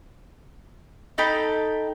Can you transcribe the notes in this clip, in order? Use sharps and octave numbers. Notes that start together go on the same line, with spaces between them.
D#4 A4 G5 B5